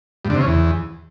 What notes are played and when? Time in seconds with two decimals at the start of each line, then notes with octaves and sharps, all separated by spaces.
0.25 G2
0.30 D3
0.35 C3
0.41 C#3
0.46 E2